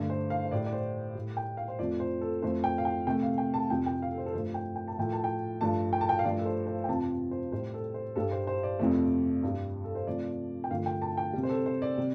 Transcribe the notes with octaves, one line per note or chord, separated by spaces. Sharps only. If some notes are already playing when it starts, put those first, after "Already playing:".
Already playing: G2 D3 A3
C5
F5
C5
A2 G3 D5
D5
C5
A2 G3
G5
F5
C5
F2 F3 A3 D5
C5
A4
F2 F3 A3 C5
G5
F5
G5
C3 A3 G5
F5
G5
A5
F2 C3 G3 G5
G5
F5
A4
C5
A4
G2 F3 A3 C5
G5
G5
A5
A2 F3 A3 G5
A5
G5
G2 F3 A3 A5
G5
A5
G5
F5
G2 F3 A3 D5
A4
C5
C5
G5
F2 C3 F3 A5
C5
A2 G3 C5
A4
C5
G2 G3 A4
C5
C5
D5
F2 C3 F3 A3
G2 G3
A4
C5
C3 F3 A3 D5
G5
G2 D3 F3 A3 F5
G5
A5
G5
C3 G3
C5
A4
C5
D5
C3 G3